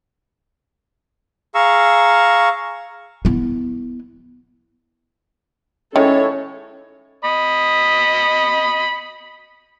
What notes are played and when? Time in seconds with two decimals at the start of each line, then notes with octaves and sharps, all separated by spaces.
1.55 G#4 F5 A#5 C#6 E6
3.25 B3 E4
5.96 A2 D#3 G#3 C#4 A4 C#5
7.24 D#5 B5